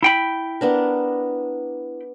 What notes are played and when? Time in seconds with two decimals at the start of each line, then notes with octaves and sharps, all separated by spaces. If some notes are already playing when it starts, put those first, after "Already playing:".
0.03 E4 G5 B5
0.61 B3 D4 A#4